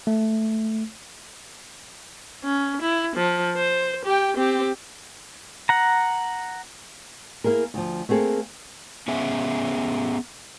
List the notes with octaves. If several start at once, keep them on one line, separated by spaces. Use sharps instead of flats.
A3
C#4
E4
F3
C5
G4 G5
C4 G4
F#5 A#5
A#3 E4 G#4 A#4
D2 F3
A3 A#3 C4 G#4 A4
B3 C#4 G#4 E5